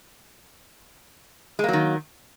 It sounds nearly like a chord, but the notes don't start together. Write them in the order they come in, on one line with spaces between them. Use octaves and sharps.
G#3 A#3 F#3 D#3